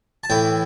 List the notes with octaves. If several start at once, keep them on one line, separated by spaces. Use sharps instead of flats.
A5
A2 E3 G5